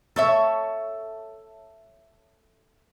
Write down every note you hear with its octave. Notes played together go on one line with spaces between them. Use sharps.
A4 C#5 E5